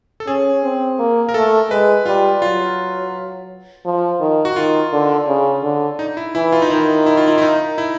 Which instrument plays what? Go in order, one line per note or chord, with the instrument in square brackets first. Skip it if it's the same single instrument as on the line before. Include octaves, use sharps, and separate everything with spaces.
[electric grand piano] A4
[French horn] C#4 [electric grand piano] G#4
[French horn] C4
A#3
[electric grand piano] A#4
[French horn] A3 [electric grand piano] A4
[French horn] G#3 [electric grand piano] B4
[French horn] G3 [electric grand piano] F4
[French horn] F#3 [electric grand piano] F4
[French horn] F3
D#3
[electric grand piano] F#4
[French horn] D#3 [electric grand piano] F4
[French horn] D3
C#3
D3
[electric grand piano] D#4
E4
[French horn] E3 [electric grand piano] E4
[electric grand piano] F4
D#4
[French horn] D#3 [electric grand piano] E4
[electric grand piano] E4
F4
E4
E4
D#4
E4